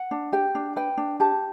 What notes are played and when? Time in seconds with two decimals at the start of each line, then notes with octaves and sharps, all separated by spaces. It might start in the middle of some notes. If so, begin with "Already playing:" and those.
Already playing: F#5
0.11 D4
0.32 G4 G5
0.55 D4
0.76 B4 G5
0.97 D4
1.20 G4 A5